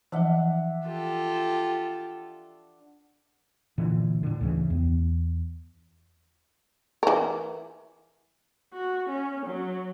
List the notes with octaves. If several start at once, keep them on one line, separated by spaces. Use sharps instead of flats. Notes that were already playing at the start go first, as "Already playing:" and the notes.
E3 F3 D4 E5 F#5
F4 G4 A4
A#2 D3 E3
A2 D3
D2 C#3 E3
E2
E3 A#4
F#4
C#4
F#3